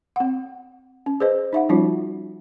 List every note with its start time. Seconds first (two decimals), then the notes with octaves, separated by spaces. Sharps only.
0.16 C4 F#5
1.06 C#4
1.20 G#4 B4 C5 D#5
1.53 D#4 E5 F#5
1.69 F3 G3 C#4 D#4 F4 F#4